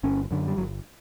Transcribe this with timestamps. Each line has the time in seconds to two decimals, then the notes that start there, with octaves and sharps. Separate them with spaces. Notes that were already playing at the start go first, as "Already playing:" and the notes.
0.03 G1 C#4
0.31 F#2 D3
0.47 G3
0.57 G1 F#3